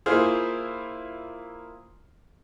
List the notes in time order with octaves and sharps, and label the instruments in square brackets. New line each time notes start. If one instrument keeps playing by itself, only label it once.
[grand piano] A#3 E4 F4 [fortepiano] G#4 C5 F6